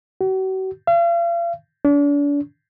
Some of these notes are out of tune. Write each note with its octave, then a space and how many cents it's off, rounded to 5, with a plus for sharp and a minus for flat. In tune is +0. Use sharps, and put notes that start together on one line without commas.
F#4 +40
F5 -40
D4 -40